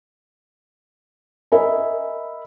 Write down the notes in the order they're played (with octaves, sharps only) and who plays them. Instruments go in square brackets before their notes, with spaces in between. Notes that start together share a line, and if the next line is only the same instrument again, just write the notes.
[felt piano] A#4 D#5 E5 G#5 B5